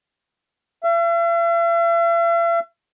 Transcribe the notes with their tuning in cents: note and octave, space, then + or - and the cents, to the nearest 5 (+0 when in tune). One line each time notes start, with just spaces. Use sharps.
E5 +45